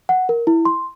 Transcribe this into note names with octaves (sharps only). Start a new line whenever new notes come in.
F#5
A#4
E4
C6